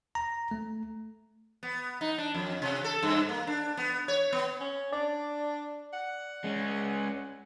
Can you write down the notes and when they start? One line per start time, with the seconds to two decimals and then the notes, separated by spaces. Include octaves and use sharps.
0.15 A#5
0.51 A3
1.63 B3
2.01 D#4
2.18 D4
2.35 F2
2.62 C3
2.84 A4
3.03 G2
3.29 A#3
3.47 D4
3.77 B3
4.08 C#5
4.33 B3
4.60 C#4
4.93 D4 D5
5.93 F#5
6.44 G#3 C#4